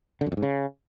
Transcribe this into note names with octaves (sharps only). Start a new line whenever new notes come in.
D3
F#2
F2
G#2
C#3